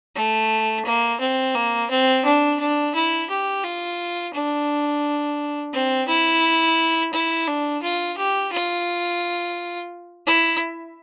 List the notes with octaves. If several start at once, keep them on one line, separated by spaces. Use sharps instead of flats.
A3
A#3
C4
A#3
C4
D4
D4
E4
G4
F4
D4
C4
E4
E4
D4
F4
G4
F4
E4